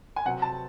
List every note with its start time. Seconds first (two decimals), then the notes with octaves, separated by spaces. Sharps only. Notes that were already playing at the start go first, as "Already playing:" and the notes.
0.16 G#5
0.25 C3 F#3 C4 F#5
0.42 A5